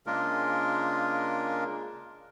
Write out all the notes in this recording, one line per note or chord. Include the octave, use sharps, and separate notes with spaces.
C#3 G#3 A#3 D4 F4 A#4